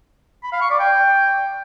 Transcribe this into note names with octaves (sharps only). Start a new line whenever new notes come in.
B5
F5
C#6
D5
G5